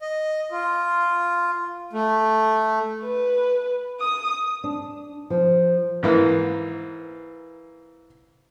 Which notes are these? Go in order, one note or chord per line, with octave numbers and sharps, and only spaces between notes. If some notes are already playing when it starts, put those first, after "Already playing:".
D#5
F4
A3
B4
D#6
D4
F3
G#2 E3 A#3